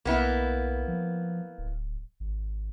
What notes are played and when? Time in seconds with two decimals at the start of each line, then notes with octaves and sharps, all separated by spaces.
0.05 B1 A#3 B3 E4
0.88 F3
1.58 D1
2.20 G#1